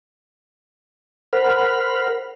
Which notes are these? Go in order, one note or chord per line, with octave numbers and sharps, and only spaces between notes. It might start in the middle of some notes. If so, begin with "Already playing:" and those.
A#4 C5 F#5 B5 F6